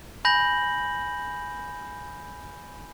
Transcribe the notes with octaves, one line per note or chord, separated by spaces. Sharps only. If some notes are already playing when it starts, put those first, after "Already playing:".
G#5 B5 G6 A#6 F#7